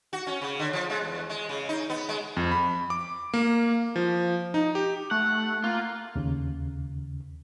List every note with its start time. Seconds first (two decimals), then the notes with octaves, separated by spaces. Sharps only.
0.13 F#4
0.27 C#4
0.42 C#3
0.59 D3
0.73 F3
0.90 G#3
1.04 E2
1.29 G#3
1.49 C#3
1.69 D#4
1.90 B3
2.09 G#3
2.37 F2
2.51 B5
2.90 D6
3.34 A#3
3.96 F3
4.54 D#4
4.75 G4
5.11 A3 F#5
5.64 A#3 F4
6.16 D#2 C#3